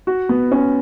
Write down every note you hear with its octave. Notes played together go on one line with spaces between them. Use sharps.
F#4
B3
C#4